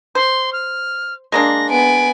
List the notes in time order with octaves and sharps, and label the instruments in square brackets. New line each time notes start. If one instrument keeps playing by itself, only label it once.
[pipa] C5 [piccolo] C6
[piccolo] F6
[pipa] G#3 A#3 D4 [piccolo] A#6
[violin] B3 G#5 [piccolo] D7